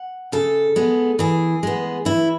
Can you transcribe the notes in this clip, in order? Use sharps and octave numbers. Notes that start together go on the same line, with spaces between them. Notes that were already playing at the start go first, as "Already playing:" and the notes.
Already playing: F#5
C#3 A4
G#3 B3
E3 G#4
G#3 B3
E3 E4